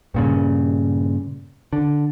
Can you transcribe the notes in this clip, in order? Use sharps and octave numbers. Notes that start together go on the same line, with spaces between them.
G2 A#2 C#3
D3